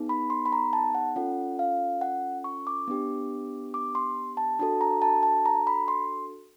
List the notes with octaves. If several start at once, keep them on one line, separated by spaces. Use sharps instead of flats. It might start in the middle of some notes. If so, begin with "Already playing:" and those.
Already playing: B3 D#4 G#4
B5
C6
B5
A#5
A5
F#5
C#4 F4 A4 F#5
F5
F#5
C#6
D6
B3 D4 G4
D6
C6
A5
D4 F#4 A4 A5
A#5
A5
A5
A#5
B5
C6